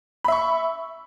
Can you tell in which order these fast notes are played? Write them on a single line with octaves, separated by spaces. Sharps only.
B5 E5 C#6